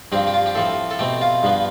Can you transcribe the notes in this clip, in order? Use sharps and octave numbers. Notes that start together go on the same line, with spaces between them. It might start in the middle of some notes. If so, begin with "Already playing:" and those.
G2 F3 C4 G4
G4
F4
G4
A2 F3 C4 A4
A4
B2 A3 C4 G4
F4
G2 F3 B3